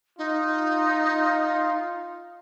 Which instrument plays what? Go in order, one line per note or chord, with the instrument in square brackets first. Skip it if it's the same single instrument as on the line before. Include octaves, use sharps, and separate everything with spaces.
[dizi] D#4 [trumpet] F4